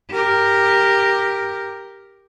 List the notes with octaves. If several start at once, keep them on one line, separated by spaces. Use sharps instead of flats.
G4 A#4